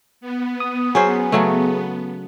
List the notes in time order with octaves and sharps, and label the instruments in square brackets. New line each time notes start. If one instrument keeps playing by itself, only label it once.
[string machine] B3
[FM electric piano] D#6
[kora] F#3 C#4 C5 [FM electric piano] G#4
[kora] C#3 F#3 A3